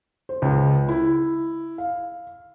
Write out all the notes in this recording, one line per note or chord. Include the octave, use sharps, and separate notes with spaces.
C5
C#2
E4
F5